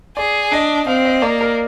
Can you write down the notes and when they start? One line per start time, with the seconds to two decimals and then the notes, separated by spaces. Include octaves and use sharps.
0.17 G#4 D5
0.52 D4 D#5
0.87 C4 F5
1.05 D#5
1.22 A#3 D5
1.41 A#4